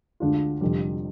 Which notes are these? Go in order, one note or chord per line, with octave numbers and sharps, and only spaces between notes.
D2 D3 G#3 D4 F4
F1 F2 D3 G3